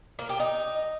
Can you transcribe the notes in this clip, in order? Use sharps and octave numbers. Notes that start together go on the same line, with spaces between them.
A#3
G4
D#4